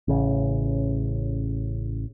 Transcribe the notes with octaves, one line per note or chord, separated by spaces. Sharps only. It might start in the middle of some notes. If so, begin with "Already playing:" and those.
A1 C#3